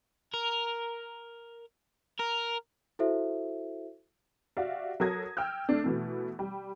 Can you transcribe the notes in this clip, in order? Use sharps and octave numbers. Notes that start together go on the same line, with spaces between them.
A#4
A#4
E4 F#4 A4 C5 E5
F#4 G4 D5 E5 F5
F#3 A4 A#4 D#6 G#6 A#6
G5 E6 F6 G6
A3 D4
B2 E3 A3
G3